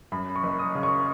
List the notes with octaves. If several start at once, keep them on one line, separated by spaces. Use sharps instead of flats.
F#2 B5
C#6
F#1
D#6
C#3
C#6